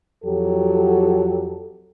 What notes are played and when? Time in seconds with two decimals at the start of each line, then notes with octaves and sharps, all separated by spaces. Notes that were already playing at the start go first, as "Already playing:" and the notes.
0.24 F2 F#3 G4 A4